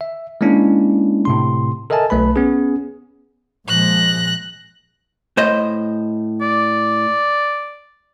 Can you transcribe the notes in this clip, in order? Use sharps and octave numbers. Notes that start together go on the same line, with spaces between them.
E5
G#3 A#3 C#4 D4 E4
A2 C3 C6
A4 A#4 D#5 E5 G#5 A5
B1 A3 B4 B5
B3 C#4 G#4
A#2 F3 G#3 F#6 A#6
A2 C5 D#5
D5